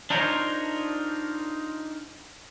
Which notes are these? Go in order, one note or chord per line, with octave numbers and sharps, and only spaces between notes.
D4 D#4 F4 A#4 C5 C#5